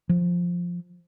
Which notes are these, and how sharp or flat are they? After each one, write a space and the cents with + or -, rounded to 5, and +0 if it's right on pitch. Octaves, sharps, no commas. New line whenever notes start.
F3 +5